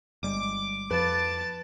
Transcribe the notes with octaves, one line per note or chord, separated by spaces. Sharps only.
G1 G3 G#3 D6
F2 F3 B4 A5 A6